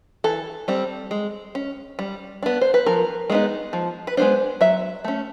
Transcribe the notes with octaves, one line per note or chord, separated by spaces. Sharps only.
E3 A4
G3 C4
G#3
C#4
G3
B3 D4
C5
B4
F3 A#4
G#3 B3 D#4
F3
B4
G#3 B3 D4 C5
F#3 E5
A3 C#4